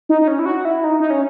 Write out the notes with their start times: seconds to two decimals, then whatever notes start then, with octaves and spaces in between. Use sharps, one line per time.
0.09 D#4
0.22 D#4
0.28 C#4
0.39 E4
0.46 F#4
0.65 E4
0.84 D#4
1.00 D#4
1.10 C#4